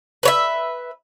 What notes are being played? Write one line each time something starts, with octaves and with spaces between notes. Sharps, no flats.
B4 C#5 E5